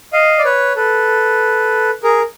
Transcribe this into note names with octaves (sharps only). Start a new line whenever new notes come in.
D#5 F5
D5
B4 C#5
A4 B4
G#4 A#4